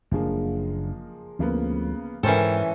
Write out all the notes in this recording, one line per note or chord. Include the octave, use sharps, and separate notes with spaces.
F#1 F3 G#3 A#3 D4
D2 C#3 F3 A#3 B3
G#2 E3 C#4 A4 A#4 C5 G5